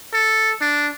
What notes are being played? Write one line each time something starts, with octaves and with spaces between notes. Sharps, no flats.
A4
D4